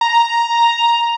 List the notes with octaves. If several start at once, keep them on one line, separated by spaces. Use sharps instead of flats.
A#5